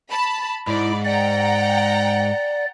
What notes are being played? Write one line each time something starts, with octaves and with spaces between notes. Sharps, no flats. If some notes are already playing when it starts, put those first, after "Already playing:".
A5 B5
G#2 E4 D5
D5 F#5 G5 A#5